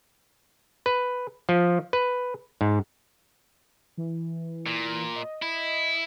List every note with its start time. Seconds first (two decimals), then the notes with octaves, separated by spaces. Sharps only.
0.86 B4
1.49 F3
1.93 B4
2.61 G#2
3.97 E3
4.66 A#2
5.16 D#5
5.42 E4